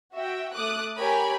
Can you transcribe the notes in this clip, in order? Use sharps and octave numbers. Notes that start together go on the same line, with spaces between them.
F#4 E5 G5
A3 D6 D#6 F#6
G4 A#4 C#5 G#5 B5